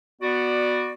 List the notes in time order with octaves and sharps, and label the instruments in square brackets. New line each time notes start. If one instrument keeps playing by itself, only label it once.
[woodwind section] B3 F#4 D5